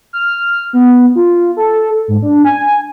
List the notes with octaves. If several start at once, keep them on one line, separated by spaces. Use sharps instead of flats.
F6
B3
F4
A4
G#2
D4
G#5